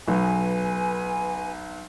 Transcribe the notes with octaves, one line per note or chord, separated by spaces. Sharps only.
B1 B4 G#5